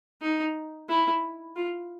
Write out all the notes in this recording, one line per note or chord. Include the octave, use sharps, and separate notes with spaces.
D#4
E4
F4